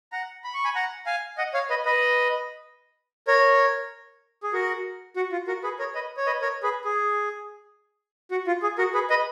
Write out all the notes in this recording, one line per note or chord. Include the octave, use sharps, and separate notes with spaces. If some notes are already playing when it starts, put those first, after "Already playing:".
F#5 A#5
B5
C#6
G#5 B5
F#5 A#5
F5 G#5
D#5 F#5
C#5 F5
B4 D#5
B4 D#5
A#4 C#5
G#4
F#4 A#4
F#4
F4
F#4 A#4
G#4 B4
A#4 C#5
B4 D#5
C#5
B4 D#5
A#4 C#5
G#4 B4
G#4
F#4
F4
G#4
F#4 A#4
G#4 B4
B4 D#5